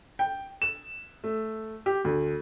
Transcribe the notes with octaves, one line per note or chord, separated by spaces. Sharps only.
G5
E7
A3
G4
D2